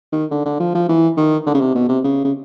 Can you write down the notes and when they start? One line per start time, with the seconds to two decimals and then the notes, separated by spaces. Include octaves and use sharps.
0.12 D#3
0.31 D3
0.46 D3
0.60 F3
0.75 F3
0.89 E3
1.17 D#3
1.46 D3
1.54 C#3
1.61 C3
1.75 B2
1.89 C3
2.04 C#3
2.24 C#3